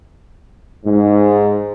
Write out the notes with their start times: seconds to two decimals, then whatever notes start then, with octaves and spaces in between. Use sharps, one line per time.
0.85 G#2